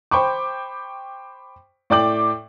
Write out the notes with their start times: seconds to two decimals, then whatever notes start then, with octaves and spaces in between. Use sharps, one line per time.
0.11 C5 G5 B5 C#6 D6
1.90 A2 D5 G5 D6 F#7